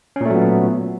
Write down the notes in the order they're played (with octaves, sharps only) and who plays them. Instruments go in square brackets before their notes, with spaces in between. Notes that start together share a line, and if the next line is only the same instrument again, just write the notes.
[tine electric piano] C#4
A#2
A3
F#3
B3